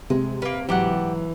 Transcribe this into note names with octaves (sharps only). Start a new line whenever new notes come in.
C3 G#3
A#3 C#4 B4
G#2 E3 F#3 G4 D5 F#5